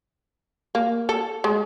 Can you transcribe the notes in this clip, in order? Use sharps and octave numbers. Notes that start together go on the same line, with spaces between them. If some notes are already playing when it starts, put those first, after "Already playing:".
A#3
A4
G#3